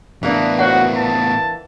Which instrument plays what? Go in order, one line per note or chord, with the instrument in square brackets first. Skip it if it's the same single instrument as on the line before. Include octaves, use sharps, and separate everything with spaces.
[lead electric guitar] A2 B3 [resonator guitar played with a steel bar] E3 A#3 D4
[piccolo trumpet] F#4 [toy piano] C5 C#5 F#5
[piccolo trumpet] A5